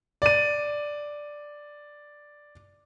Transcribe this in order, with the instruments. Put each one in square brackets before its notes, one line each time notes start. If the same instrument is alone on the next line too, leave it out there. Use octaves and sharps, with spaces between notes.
[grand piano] D5 D#7